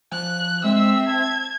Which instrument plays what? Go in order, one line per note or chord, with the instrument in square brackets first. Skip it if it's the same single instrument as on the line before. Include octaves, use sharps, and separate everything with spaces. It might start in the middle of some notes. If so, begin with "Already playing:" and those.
[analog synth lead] F3 [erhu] F#6
[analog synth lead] G#3 [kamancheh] C4 E5 [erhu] E6
[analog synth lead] A5 [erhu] G#6